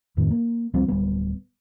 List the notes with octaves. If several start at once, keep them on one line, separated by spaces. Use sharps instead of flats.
D#1 F2 A2 D#3
A#3
C#2 F3 G3 C4
D1 G3 B3